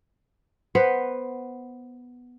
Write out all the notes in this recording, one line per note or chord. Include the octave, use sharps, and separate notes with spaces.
B3 B4 C5